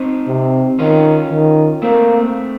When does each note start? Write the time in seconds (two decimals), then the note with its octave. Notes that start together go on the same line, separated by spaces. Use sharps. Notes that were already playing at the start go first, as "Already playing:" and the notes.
Already playing: C4 D#4
0.27 C3
0.79 D#3 C#4 F4
1.31 D#3
1.82 A3 A#3 C4